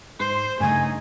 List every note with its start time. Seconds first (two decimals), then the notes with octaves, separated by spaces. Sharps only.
0.20 G#2 C5 C6 C7
0.61 G2 C#3 A3 D#4 G#5